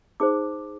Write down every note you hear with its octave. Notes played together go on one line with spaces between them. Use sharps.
D#4 G#4 C5 D6